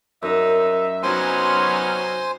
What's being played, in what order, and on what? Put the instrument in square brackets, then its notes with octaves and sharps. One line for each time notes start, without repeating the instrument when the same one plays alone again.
[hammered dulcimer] F#2 [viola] D#4 [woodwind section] E5
[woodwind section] C3 B3 C#4 [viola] F#3 D#4 [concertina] C5 G#5 C6